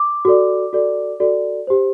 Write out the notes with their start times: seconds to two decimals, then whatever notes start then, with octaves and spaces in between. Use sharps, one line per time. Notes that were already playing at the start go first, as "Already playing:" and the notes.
Already playing: D6
0.25 F#4 A4 D5
0.73 F#4 A4 D5
1.20 F#4 A4 D5
1.67 G4 C5